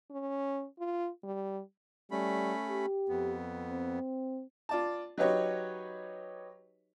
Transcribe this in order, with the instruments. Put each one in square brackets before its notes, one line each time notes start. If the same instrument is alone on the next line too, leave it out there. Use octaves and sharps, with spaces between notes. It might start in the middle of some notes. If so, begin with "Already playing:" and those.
[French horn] C#4
F4
G3
[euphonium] G3 [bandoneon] A3 C#4 B5
[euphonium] G4
[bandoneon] F2 B3
[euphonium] C4
[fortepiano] F4 D5 A5
F#3 D#4 G4 B4 C#5 D#5